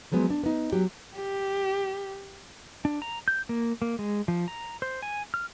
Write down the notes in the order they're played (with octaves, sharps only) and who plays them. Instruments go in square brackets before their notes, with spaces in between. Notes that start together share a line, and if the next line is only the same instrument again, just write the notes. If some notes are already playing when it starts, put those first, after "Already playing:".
[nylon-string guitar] F3 F#3 G#3 B3
D4
B3 D#4
F#3 G4
[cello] G4
[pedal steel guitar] D4
A#5
G6
A#3
A#3
G#3
F3
A#5
C5
G#5
F6